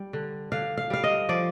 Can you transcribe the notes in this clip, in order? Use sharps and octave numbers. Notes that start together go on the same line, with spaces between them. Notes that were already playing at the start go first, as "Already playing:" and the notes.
Already playing: G3
D3
D3 F5
F5
G3 F5
D#5
F3 D5